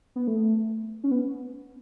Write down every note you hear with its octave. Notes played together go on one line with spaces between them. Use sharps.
B3
A3
C#4
B3